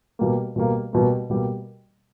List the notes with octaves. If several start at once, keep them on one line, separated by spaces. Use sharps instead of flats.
B2 G3 A#3
B2 G3 A#3
B2 G3 A#3
B2 G3 A#3